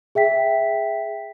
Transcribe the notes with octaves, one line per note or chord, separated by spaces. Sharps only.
G#4 E5 G5 B6